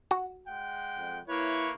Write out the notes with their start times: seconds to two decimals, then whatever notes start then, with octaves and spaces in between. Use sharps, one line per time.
0.11 F#4
0.48 G#3 F#5 G5
0.97 F2
1.28 A#3 E4 B4 C#5